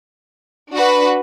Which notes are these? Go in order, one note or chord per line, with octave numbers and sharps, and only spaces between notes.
D4 F#4 B4